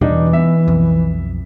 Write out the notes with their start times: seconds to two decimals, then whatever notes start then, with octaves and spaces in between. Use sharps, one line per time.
0.01 E2 B2 E3 G3 D4 D#4
0.33 B3 E5
0.68 B1 F2